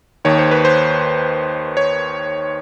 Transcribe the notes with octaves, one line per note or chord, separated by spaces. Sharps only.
D#2 D#3 C#5
C5
B4
C5
C#5